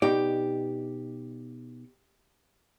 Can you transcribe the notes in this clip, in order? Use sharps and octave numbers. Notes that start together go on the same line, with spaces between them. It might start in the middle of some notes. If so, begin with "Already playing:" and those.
B2 D#4 G4 D5